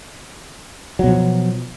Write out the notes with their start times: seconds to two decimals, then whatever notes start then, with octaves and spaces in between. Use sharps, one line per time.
0.99 F#3
1.04 B2
1.08 F3